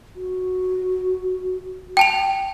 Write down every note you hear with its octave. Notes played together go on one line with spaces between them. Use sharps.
F#4
G5 A5 F7